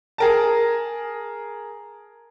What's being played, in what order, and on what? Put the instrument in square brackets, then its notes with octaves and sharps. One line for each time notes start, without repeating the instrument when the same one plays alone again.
[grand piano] G#4 A#4 A5